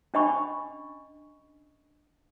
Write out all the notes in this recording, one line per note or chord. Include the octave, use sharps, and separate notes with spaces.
C#4 D4 D#5 G#5 B5 C#6